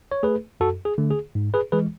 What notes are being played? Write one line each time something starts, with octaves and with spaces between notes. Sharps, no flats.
C#5
A3 G#4 B4
F#2 F#4 A4
G#4
D3 A3
G#4
G#2
G#4 B4
E3 G#3 G#4 B4